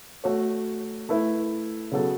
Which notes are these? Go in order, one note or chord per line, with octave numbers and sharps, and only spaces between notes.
A3 F#4 C#5
A3 E4 B4
C#3 F#3 B3 A4